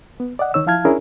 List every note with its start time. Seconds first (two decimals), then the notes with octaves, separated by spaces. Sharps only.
0.20 B3
0.39 D5 D#5 F#5
0.54 C#2 D#3 D#4 C#5 E6
0.66 F3 E4 F5 A5 F6 G#6
0.85 C#4 D4 E4 G#4 A#4 C#5